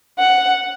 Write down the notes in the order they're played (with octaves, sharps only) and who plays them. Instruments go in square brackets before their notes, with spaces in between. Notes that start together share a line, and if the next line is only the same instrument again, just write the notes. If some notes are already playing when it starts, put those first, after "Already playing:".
[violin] F#5